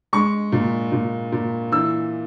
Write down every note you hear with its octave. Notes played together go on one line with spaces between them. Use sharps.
G#3 C#6
A#2
A#2
A#2
E3 E6